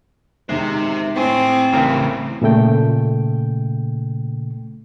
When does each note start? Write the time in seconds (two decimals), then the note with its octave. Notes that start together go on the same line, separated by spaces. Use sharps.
0.49 C3 D#3 G#3 C5 E5
1.16 A2 C4 A4 G#5
1.73 A1 A2 C#3 A#4 G5
2.42 A#2 C#3 A3 G5